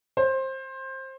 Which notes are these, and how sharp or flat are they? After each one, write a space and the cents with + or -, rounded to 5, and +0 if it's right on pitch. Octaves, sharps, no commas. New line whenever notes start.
C5 +20